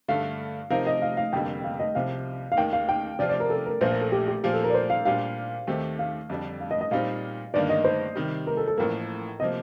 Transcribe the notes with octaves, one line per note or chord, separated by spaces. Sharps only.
G2 D3 A3 F5
C3 F3 C4 D#4 A#4 F5
D#5
F5
F5
F1 F2 D3 G3 A#3 G5
F5
D#5
C2 C3 F3 F5
F5
D#2 D#3 A#3 G5
F5
G5
C3 F3 C4 F4 D5
D5
A#4
A4
A#4
A#1 A#2 F3 A#3 C5
A#4
A4
G4
G4
A#2 F3 A#3 G4
A4
A#4
D5
C5
F5
A#2 G3 D4 G4 C5 F5
D#2 D#3 A3 C4 G4
F5
F2 D3 G3 D4
F5
D#5
D#5
A#2 G3 C4 D#4 F5
G1 G2 D#3 A#3 D5
D#5
C5
C3 D#3 G3
A#4
A4
A4
A1 A2 F3 A#3 A#4
C3 F3 A#3 D#5